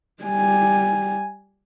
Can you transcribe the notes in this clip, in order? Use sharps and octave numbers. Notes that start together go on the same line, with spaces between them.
G3 G#5